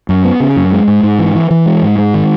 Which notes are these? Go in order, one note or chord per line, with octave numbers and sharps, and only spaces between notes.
F#2
B3
C#3
F#2
G#3
G#2
G#2
E3
E3
E3
G#3
G#2
G#3
D#3